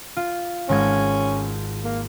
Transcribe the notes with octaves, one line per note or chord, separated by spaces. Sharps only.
F4
G#1 G#3 C#4 G#6
A#3